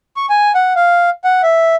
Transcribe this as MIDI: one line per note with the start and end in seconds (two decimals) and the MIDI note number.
0.17 0.26 85
0.29 0.52 80
0.55 0.73 78
0.76 1.10 77
1.24 1.41 78
1.43 1.76 76